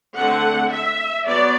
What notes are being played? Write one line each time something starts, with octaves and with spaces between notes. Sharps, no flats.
D3 A3 C4 F#5
E5
F#3 B3 D5